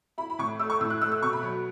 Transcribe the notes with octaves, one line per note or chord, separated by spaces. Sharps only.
E4 B5
B5
A2 C#6
A3 E6
C#6
A2 E6
F#6
A3 E6
E6
B2 C#6
B5
F#3